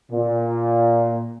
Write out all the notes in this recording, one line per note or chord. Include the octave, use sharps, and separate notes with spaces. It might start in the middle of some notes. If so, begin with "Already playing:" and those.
A#2